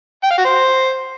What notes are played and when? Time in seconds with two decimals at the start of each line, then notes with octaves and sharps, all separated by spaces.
0.24 G5
0.31 F5
0.38 F#4
0.45 C5